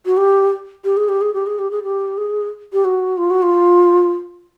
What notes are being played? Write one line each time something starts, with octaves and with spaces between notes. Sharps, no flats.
F#4
G4
G4
G#4
G4
G#4
G4
G#4
G4
G#4
G4
G#4
G4
F#4
F4
F#4
F4